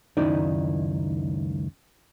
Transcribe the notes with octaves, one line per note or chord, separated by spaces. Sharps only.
C#2 F#2 D#3 D#4 E4 D5